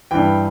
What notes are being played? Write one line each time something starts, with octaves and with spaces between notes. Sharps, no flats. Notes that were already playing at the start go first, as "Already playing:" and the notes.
G2 E3 G5